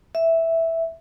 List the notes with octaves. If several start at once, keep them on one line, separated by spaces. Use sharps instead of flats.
E5